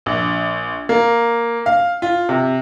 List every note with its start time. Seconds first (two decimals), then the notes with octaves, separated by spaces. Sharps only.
0.06 A#1
0.89 A#3
1.66 F5
2.02 F4
2.29 C3